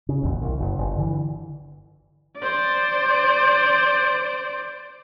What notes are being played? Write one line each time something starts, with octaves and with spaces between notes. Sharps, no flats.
C#3
E1 A1 D#2
C2
F#1
G1
D3 E3
C5 D5